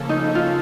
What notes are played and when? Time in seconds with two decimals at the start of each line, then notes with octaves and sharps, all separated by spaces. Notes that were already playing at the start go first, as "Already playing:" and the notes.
Already playing: C#3 F3 A#3 C#4 A4
0.09 D#4
0.35 F4